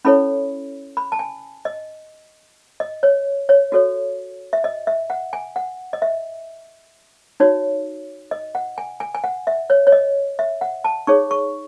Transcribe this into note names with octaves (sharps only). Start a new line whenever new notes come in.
C#4 E4 A4 C#5 B5
B5
A5
G#5
D#5
D#5
C#5
C#5
F#4 A4 C#5
E5
D#5
E5
F#5
G#5
F#5
D#5
E5
D#4 F#4 C#5
D#5
F#5
G#5
G#5
G#5
F#5
E5
C#5
C#5
D#5
E5
F#5
A5
D#4 G#4 C#5 C#6
C#6